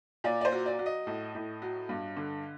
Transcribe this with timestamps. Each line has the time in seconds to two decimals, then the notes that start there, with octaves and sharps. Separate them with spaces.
0.24 A#2 D5
0.41 D5
0.45 C5
0.52 F#3
0.66 D5
0.79 F#3
0.86 D#5
1.07 A2
1.35 A2
1.62 F#3
1.89 G2
2.17 D3